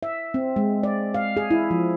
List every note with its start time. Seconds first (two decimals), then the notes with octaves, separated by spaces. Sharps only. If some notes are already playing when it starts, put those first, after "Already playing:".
0.03 E5
0.34 C4
0.56 G#3
0.83 D5
1.14 F5
1.37 G#4
1.51 E4
1.71 F3